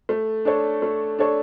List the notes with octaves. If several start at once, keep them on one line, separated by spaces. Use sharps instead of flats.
A3
D4 A4 C#5
A3
D4 A4 C#5